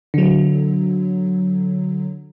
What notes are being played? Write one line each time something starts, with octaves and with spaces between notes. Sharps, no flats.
D3 F#3